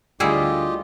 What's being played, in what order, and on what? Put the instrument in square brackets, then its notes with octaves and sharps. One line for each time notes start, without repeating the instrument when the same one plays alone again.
[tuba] D2 [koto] G3 E4 G#4 [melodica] F4 G4 D#5